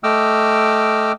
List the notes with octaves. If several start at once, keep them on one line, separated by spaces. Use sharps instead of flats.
A3 D#5 G5 D6 E6 F6